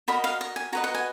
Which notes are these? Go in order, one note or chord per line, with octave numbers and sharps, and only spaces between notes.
F#4 A#4 D#5 B5
F5
D#5
G#5
F#4 B4 D#5 A#5
F#5
G#5